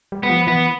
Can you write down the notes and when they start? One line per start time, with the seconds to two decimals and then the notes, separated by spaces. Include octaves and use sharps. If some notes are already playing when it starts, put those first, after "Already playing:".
0.12 G3
0.23 G3 B3
0.30 F3
0.47 E3 B3